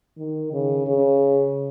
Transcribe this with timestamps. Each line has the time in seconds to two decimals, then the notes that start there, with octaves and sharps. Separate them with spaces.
0.18 D#3
0.53 C#3
0.87 C#3